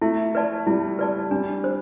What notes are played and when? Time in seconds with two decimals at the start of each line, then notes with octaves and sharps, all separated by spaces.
0.02 A3 E4
0.35 B4 D5 A5
0.67 G3 E4
0.99 B4 D5 A5
1.31 G3 D4
1.64 C5